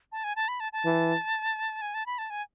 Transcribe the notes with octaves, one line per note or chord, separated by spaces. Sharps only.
A5
G#5
A5
B5
A5
A5
E3
G#5
A5
B5
A5
G#5